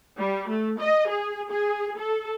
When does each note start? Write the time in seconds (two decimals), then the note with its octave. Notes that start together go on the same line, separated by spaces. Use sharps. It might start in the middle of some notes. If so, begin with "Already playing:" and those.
0.18 G3
0.49 A3
0.80 D#5
1.09 G#4
1.51 G#4
1.97 A4